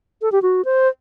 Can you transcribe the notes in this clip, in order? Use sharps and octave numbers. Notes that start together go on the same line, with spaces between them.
A4
G4
F#4
C5